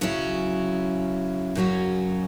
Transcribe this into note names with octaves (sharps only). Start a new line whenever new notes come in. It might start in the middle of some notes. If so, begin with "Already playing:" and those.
C#3 F#3 C#4 E4
F#2 C#3 F#3 C#4 F#4